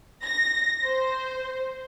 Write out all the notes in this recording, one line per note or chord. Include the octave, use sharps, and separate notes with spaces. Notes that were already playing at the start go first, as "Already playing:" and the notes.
A#6
C5